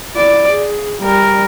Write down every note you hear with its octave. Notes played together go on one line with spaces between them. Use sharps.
E4 D5
G#4
G3 A#4